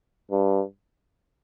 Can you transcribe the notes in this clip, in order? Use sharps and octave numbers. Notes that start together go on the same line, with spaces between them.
G2